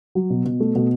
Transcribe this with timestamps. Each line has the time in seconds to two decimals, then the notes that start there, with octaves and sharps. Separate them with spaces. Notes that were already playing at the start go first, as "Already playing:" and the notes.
0.15 F#3
0.30 B2
0.45 B2
0.60 A3
0.75 B2